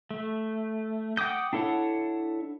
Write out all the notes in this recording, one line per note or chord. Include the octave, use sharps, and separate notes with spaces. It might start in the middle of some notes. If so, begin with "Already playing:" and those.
A3
F#5 G5 D6 D#6 G6
D4 E4 A4 C#5 F#5